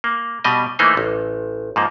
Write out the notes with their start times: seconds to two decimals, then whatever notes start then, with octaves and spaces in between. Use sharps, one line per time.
0.04 A#3
0.44 B2 G3 D#5
0.79 E3 A3 A#3 D#4 C5
0.97 A1
1.76 G#2 F3 A#3